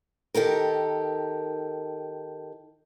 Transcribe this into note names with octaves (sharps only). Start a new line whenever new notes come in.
D#3 G4 A4 A#4